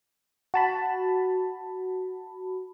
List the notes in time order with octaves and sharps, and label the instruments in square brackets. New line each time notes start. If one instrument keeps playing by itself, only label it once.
[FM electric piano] F#4 A5 B5